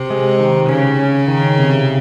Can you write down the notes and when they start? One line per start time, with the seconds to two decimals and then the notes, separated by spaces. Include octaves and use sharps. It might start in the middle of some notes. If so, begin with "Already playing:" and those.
Already playing: C3
0.10 G#3
0.40 D#3
0.69 C#3 C#4
0.99 C#4
1.28 D#3
1.59 C3